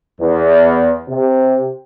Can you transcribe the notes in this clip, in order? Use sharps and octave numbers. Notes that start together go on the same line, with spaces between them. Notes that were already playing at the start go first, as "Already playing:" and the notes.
E2
C3